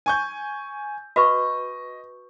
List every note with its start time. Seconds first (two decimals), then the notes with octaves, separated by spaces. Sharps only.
0.06 G#5 C#6 G6
1.16 F#4 B4 D#5 C#6